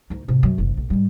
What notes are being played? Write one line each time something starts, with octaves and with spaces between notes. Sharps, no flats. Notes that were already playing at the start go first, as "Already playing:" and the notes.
D2 D#4
G#2 C3
F#2 F#3
F#1 C3
A#1
G#2 G3